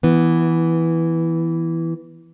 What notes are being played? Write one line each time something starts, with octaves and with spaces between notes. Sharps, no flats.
E3 B3